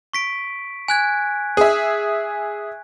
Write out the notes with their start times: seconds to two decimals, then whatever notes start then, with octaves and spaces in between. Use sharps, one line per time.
0.13 C#6 B6 D7
0.88 G#5 F#6 G#6
1.57 G#4 E5